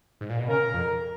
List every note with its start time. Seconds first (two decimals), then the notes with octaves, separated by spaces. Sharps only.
0.21 G#2
0.30 A#2
0.39 B2
0.48 C#3 A#4
0.73 F2